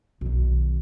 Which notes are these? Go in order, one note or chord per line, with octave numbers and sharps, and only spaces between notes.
B1 D#3